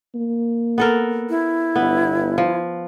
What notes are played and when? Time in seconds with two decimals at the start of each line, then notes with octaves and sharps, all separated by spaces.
0.15 A#3
0.78 B3 A4 A#4
1.29 E4
1.76 G1 B3
2.38 F3